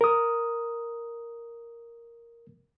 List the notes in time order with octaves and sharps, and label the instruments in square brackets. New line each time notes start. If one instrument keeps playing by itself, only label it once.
[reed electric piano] A#4 D#6